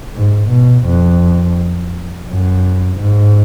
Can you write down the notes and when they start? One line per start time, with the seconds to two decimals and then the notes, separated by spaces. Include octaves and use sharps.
0.14 G#2
0.49 B2
0.85 F2
2.29 F#2
2.99 G#2